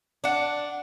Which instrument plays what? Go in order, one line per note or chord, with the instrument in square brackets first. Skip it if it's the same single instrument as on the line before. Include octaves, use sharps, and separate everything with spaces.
[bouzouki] D4 F#5